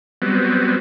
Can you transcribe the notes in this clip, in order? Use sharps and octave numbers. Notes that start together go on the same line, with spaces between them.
F#3 G3 B3 C4